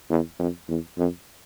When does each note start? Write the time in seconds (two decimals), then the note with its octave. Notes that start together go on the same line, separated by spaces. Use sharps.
0.10 E2
0.39 F2
0.68 E2
0.98 F2